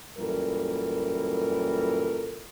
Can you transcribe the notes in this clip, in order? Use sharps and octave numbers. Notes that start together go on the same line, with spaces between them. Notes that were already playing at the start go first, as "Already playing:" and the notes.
F#2 A#2 E3 G3 A4 A#4